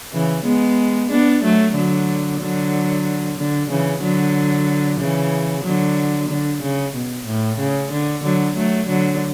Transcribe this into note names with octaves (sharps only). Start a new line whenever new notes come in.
C#3 E3
G#3 B3
B3 D4
F#3 A3
D3 F#3
D3 F#3
D3
C#3 E3
D3 F#3
C#3 E3
D3 F#3
D3
C#3
B2
A2
C#3
D3
D3 F#3
F#3 A3
D3 F#3